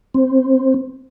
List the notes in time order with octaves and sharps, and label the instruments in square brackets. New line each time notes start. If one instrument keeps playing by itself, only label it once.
[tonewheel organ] C4